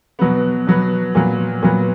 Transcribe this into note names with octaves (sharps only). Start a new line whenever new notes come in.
B2 F#3 B3
B2 F#3 B3
A#2 F#3 B3
A#2 F#3 B3